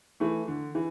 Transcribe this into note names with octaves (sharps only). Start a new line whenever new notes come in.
E3 A3
D3
E3